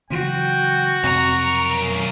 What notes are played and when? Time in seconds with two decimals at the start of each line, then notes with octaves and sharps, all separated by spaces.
0.10 C#3 E3 F#3 F#4 G5
1.03 B1 F2 C3 C4 A#4 C#6